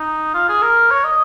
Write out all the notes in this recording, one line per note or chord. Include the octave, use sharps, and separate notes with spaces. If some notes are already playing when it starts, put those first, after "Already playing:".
Already playing: D#4
F4
G#4
A#4
C#5
D#5